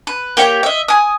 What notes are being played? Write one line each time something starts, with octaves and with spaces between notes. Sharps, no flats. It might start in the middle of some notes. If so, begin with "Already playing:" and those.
B4
A#3 G4 C#5 G5
D#5 E5
G#5 D#6